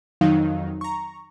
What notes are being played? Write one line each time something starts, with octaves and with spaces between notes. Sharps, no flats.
F2 D#3 F#3 D#4 F5
A#5 C#6